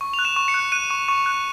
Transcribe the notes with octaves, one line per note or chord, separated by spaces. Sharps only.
C#6
F7
F#6
E7
C#6
C#7
F#6
F#6 D#7
C#6
C#6
F#6